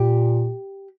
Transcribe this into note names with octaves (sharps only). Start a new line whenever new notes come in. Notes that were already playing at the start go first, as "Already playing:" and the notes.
Already playing: A#2 G4